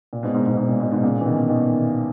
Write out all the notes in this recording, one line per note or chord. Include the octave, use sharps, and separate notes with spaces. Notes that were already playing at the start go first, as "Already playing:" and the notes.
A#2
G#2 B2
G#2
G#2 B2
G#2
A#2
G#2 B2
G#2 B2
A#2 C#3
E3
B2 D#3
B2 D#3